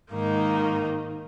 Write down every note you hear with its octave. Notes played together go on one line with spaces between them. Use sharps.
G#2 D#3 A#3 D#4